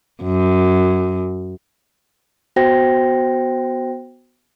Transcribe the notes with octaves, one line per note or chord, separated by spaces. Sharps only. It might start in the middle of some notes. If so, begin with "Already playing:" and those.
F#2
B3 F#4 C5 G5 A#6